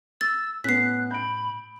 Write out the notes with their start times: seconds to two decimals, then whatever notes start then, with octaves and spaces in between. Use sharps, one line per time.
0.21 E6 A6
0.64 A2 B3 C#4 F#6 B6 C7
1.11 B5 G6 D7